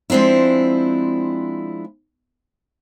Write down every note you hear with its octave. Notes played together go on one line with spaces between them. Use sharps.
F3 G#3 C4 D4 E4